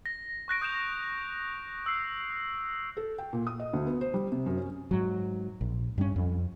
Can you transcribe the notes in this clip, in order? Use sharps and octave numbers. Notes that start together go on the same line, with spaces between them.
A#6
C#6 F#6 A#6 D7
D#6 G6 D7 E7 F7
E6 F6 C7
A4
G5
A#2
D#6
D#5
D2
B3
C5
G3
C3
F#2
C#4
G#2 F#3
A#1
G2 G3 C#4
F2